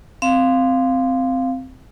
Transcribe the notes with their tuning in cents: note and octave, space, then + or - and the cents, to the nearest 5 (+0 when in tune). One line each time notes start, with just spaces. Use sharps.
C4 -10 F5 +0